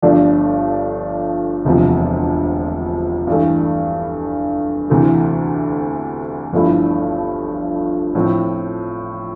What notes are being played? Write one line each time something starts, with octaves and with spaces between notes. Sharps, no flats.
G1 G2 F3 A3 D4
E1 D2 C3 F3
G2 E3 A3
D2 C3 E3 A3
G1 G2 F3 A3 E4
A2 F3 C4